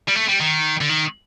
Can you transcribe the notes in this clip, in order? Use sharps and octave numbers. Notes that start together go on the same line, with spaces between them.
G3
A3
G3
D#3
D3
D#3